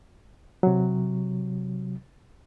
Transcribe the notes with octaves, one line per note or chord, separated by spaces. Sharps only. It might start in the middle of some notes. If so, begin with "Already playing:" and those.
C3 F#3